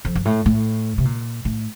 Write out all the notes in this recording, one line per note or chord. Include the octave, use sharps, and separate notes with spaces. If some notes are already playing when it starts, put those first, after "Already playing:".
F2
G2
A2
A2
C3
A#2
A2